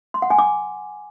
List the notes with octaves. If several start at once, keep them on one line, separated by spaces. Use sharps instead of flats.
C6
F#5
G#5
D6